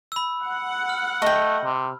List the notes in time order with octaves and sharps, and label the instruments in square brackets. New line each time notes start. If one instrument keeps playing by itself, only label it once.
[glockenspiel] B5 E6
[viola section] F#5
[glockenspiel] F6
[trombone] A3 [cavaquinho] D#5 G5
[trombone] C3